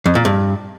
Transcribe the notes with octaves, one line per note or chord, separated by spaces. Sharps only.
F2
A#2
G2